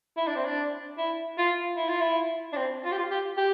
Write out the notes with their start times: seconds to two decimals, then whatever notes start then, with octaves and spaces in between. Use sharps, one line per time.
0.17 E4
0.27 D4
0.36 C4
0.45 D4
0.98 E4
1.38 F4
1.77 E4
1.88 F4
2.01 E4
2.53 D4
2.57 C4
2.84 F4
2.92 G4
2.98 F4
3.11 G4
3.37 G4